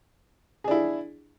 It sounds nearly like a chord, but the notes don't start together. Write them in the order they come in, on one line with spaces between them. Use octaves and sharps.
G#4 D4 E4